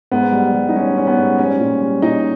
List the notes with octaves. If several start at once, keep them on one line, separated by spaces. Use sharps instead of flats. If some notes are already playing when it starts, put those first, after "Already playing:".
G#2 B3
G3
G3
D#4
G3 C#4
G3 C#4
B3
G#2
G3 C#4
A#2
G3
A#2 D#4